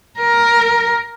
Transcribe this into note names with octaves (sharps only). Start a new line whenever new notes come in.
A#4